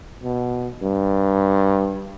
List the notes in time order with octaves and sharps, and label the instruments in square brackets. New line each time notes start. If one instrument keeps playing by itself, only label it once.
[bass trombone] B2
G2